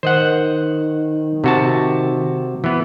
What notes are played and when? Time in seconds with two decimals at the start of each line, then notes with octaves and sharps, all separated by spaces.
0.03 D#3 C5 D#5 F#5
1.44 C3 F#4 A5
2.64 E3 B3